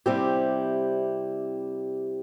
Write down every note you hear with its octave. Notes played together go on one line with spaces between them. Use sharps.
C3 G3 C4 E4 G4